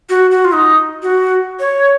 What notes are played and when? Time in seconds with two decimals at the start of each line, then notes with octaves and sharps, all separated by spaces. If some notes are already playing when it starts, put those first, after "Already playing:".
0.09 F#4
0.31 F#4
0.45 F4
0.52 D#4
1.03 F#4
1.60 C#5